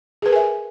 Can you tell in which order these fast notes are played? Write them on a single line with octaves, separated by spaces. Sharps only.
G#4 B4 A#4 G#5 E5